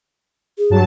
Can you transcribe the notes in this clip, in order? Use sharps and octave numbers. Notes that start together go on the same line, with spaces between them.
G#4
G2 F#3 A5